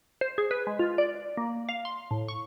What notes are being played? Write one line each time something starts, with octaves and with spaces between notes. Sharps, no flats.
C5
G#4
B4
G#3
F4
D5
A#3
F5
C6
A2
C#6